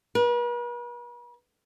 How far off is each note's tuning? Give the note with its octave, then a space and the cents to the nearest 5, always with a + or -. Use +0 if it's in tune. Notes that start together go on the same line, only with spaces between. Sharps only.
B4 -45